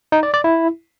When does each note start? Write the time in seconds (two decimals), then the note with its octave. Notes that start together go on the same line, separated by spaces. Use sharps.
0.12 D#4
0.23 D5
0.34 D5
0.44 E4